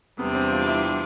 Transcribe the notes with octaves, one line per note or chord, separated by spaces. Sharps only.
E2 C3 G3 B3 D4
C4
F4
E4